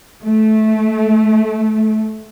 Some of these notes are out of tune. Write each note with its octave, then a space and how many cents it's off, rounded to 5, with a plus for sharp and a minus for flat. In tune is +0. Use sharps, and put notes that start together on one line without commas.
A3 -15